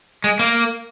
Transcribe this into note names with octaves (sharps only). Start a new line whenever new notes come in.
G#3
A#3